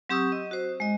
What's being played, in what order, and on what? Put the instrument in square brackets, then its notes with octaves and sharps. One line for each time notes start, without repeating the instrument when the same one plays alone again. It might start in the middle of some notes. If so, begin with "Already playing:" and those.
[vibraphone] F#3 C4 G4 C#6 D#6 E6
D#5
F#4 C5
G#3 D#5